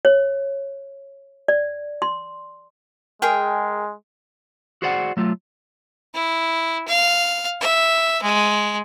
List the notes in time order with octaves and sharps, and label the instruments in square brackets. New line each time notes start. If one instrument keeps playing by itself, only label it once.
[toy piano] C#5
D5
C6
[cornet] G#3 [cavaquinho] G#4 A#4 G5
[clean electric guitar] F#4 G#4 C5 D5 E5 F#5
F#3 A3 F4
[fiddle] E4
F5
E5
G#3